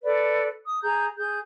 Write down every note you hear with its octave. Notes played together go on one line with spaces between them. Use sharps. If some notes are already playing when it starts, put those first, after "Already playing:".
A4 B4 D5
D#6
G#4 A#5 G6
G#4 G6